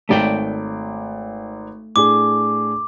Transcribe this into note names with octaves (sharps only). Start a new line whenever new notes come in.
G#1 A3 C#5 D5 G5
A2 D4 G#4 D6